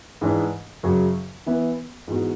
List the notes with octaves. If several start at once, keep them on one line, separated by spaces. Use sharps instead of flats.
G#2 E3 G#3 D4
F#2 C#3 F#3
E3 B3 E4
G#2 E3 G#3 B3 F#4